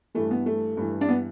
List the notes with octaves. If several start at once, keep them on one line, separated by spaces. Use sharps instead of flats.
G2 E3 A3
B3
A3
G2 E3
D4
B3